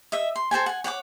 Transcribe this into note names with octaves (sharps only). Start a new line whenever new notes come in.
D#5 E5
C6
A4 C5 G5 G#5
F#5 G#5
C#5 F#5 G5 D6